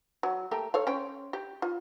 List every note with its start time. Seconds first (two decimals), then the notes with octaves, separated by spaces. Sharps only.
0.23 F#3
0.51 A3 A#3 G4
0.74 A4 C#5 F5
0.87 C#4 C5 G5
1.33 G4
1.62 F4